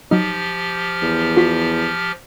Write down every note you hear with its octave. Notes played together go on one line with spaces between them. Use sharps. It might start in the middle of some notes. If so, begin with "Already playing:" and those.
F3 F#3 D#4 G4 F6
E2
F4 F#4 B6